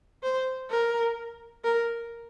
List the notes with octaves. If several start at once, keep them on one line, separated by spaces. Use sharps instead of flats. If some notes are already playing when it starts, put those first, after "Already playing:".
C5
A#4
A#4